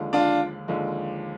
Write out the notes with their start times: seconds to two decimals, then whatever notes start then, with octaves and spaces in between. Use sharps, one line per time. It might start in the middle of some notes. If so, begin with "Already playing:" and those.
Already playing: D#2 D3 F3 G#3
0.13 D4 F4
0.68 D#2 D3 F3 G#3